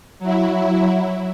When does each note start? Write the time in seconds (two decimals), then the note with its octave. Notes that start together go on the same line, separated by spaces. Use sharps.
0.19 F#3 E4